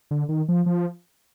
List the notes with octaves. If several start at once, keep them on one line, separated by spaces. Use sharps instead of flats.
D3
D#3
F3
F3